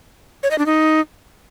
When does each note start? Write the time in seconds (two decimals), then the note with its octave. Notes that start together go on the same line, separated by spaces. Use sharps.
0.43 C#5
0.51 D#5
0.58 D4
0.66 D#4